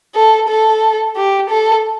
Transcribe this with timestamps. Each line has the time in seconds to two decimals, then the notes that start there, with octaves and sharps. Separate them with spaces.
0.15 A4
0.48 A4
1.16 G4
1.49 A4